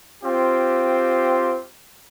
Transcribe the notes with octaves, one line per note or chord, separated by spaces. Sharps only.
C4 F4 G4